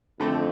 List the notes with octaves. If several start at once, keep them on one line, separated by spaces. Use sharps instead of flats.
F2 D3 A3 C4